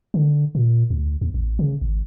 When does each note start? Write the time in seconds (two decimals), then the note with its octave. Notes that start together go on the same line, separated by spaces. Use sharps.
0.14 D3
0.55 A#2
0.90 D2
1.21 D#2
1.34 A1
1.59 C#3
1.81 G#1